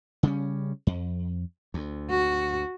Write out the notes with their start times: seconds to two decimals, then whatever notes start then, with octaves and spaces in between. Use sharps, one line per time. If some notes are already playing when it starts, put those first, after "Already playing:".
0.23 C#3 G3 C#4
0.87 F2
1.74 D2
2.10 F#4